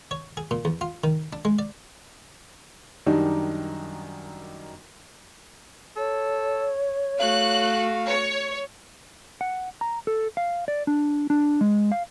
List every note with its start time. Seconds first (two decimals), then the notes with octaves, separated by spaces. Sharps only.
0.11 C#5
0.37 G#4
0.51 A#2
0.65 E2
0.81 F4
1.04 D#3
1.33 D4
1.45 G#3
1.59 D5
3.06 F#2 D#3 G3 D4 D#4
5.97 A4 C#5
7.20 A3 F#4 F5 F#6
8.07 C#5
9.41 F#5
9.81 A#5
10.07 A4
10.37 F5
10.68 D5
10.87 D4
11.30 D4
11.61 G#3
11.92 F5